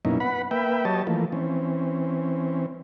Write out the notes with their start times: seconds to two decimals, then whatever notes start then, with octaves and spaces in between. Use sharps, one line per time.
0.05 F#2 B2 A#3 C#4 D#4 E4
0.20 B4 F#5 B5
0.51 A#3 B4 E5 G5
0.85 F#3 G4 C#5 D#5 A5
1.07 E3 F3 A3 A#3
1.32 E3 C4 C#4